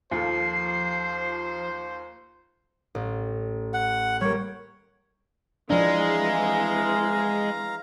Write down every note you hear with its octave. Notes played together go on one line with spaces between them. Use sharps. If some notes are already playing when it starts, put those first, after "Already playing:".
D#2 F3 F4 A4 C5 C7
A1
F#5
G3 A#3 C#5
E3 F3 G#3 C4 D4 G#4 F5 A#5